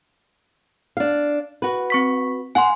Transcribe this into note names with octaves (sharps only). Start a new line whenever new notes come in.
D4 F5
F#4 B4
C4 C#6 B6
F5 F#5 G#5 C6